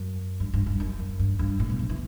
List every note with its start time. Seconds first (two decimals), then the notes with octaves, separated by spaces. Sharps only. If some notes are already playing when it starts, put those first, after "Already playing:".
Already playing: F#2
0.40 G2
0.53 G2
0.66 G2
0.80 F#2
0.99 F#2
1.20 G2
1.39 G2
1.60 A2
1.70 B2
1.79 F#3
1.89 E3